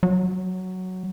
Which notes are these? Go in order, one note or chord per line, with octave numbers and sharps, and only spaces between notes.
F#3